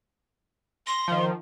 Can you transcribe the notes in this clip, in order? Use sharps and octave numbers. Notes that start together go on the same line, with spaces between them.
C6 A#6
D#3 F3